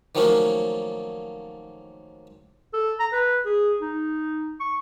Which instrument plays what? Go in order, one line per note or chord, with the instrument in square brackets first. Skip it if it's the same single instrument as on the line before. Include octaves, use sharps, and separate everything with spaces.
[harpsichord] D#3 F3 F#3 A3 A#3 C#4
[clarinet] A4
A#5
B4
G#4
D#4
C#6